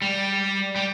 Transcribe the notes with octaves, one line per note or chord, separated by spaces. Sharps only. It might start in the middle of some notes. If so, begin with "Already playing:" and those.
G3
G3